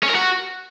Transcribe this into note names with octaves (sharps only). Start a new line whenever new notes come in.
C#4
A#4
F#4